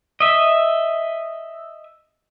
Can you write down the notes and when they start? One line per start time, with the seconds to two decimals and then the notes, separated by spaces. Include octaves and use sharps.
0.20 D#5 E5